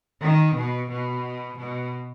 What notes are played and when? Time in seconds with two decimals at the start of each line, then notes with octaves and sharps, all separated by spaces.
0.21 D#3
0.56 B2
0.89 B2
1.58 B2